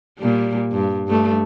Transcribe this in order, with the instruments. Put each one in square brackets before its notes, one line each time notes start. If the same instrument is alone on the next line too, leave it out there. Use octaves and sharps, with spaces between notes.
[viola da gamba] A#2 G3
G2
G2 A3